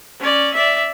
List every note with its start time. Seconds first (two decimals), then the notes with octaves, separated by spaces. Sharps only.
0.20 C#4 D5
0.54 D5 E5